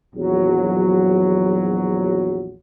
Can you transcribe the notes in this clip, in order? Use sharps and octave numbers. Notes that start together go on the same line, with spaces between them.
A#1 E2 F#3